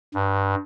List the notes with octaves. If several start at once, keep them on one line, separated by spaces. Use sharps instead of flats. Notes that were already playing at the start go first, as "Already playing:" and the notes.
G2